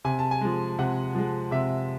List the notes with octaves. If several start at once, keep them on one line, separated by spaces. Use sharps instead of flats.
C3 G#5
A5
G#5
F3 G#3
C3 F#5
F3 G#3
C3 E5